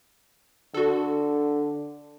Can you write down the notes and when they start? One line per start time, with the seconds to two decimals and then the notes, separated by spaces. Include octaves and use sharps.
0.74 D3 F#4 A4